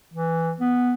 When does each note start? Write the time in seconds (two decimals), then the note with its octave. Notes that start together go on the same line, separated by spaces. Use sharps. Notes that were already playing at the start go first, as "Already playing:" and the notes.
0.13 E3
0.60 B3